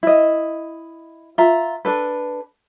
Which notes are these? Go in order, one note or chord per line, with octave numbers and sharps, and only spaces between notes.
E4 D#5
F4 E5 A#5
D4 A4 B4